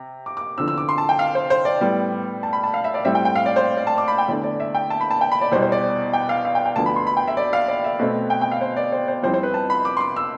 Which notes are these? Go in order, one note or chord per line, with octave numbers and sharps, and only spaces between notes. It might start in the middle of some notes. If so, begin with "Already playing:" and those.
Already playing: C3
D6
D6
E2 D3 F3 C4 E6
E6
D6
C6
A5
G5
F5
C5
C5
D5
A2 G3 B3
A5
B5
A5
F5
E5
D5
A2 G3 C4 E5
G5
G5
F5
D5
C5
D5
A5
D6
B5
G5
E2 D3 A3 D5
D5
E5
G5
A5
B5
A5
G5
B5
D5
E2 B2 G3 C5
C5
D5
G5
F5
F5
G5
G5
D2 D3 F3 B3 A5
B5
C6
B5
G5
E5
D5
F5
D5
E5
B2 A3 C4
G5
G5
F5
C5
D5
C5
C5
F2 E3 G3 C4 C5
C5
B4
A5
B5
D6
C6
D6
E6